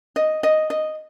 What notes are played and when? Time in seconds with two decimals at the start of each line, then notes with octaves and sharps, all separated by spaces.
0.16 D#5
0.43 D#5
0.70 D#5